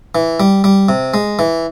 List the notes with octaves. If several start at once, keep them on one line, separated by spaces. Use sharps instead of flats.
E3
G3
G3
C3
G#3
E3